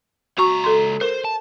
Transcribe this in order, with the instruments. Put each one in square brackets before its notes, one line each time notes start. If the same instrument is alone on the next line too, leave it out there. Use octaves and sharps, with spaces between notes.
[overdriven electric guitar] C#2 A#5 [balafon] F#4 C#6
[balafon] A4 C6
[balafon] A#4 [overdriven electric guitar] C5
[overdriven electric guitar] A5